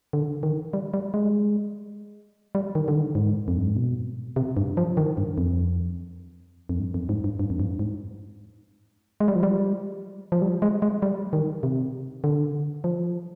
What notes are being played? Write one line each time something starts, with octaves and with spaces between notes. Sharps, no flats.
D3
D#3
G3
G3
G#3
G3
D#3
D3
D#3
G#2
F2
G2
G#2
B2
C3
G2
F3
D#3
G2
F2
F2
G2
F2
G#2
G2
G2
F2
G2
G#2
G#3
G3
F3
G3
F3
G3
G#3
G#3
G3
D#3
C3
D3
F3